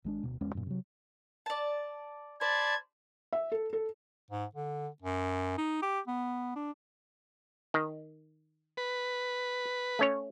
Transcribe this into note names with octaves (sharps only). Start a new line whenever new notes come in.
G#1 G#3 D4
D1 B2
D1 E2 G#3 C#4
F#2 A#2
C3 F#3
D5 A5
C5 D5 A5 B5 G#6
E5
A4
A4
G#2
D3
F#2
D#4
G4
B3
D4
D#3
B4
A3 C#4 C#5